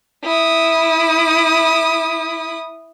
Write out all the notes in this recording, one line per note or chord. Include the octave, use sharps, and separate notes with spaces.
E4 D#6